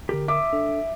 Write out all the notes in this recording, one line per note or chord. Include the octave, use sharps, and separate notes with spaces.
D3 G4 A#4
E5 D6 D#6
D4 A4